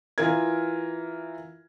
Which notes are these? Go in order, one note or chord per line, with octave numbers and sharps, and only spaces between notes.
E3 F4 A#4 G#6